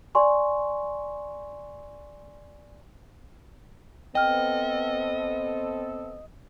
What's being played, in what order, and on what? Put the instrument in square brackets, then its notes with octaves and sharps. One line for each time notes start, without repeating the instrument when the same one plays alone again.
[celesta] D5 G#5 C6 C#6
[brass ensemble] B3 C4 A4 [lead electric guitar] D#5 [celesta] G5 F6